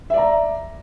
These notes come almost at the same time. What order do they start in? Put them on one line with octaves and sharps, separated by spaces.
E5 D5 A#5